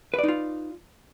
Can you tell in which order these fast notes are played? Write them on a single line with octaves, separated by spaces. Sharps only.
B4 D5 D#4 F4